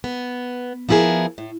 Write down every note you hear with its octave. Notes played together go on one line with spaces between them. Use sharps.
B3
F3 B3 E4 F#4 G#4 A#4
A2